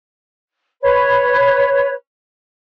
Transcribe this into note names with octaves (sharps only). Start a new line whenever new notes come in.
B4 C#5